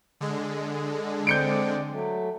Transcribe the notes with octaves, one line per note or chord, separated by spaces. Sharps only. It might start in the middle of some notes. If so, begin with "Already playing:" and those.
D3 G#3
C4 D5 G6 C#7 D7
F#3 A3